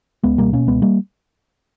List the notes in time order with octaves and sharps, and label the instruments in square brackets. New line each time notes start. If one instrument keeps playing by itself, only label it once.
[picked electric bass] C#2 G#3 B3
B2 G3 A#3
B2 A#3 C#4
C#2 G#3 B3
G3 A#3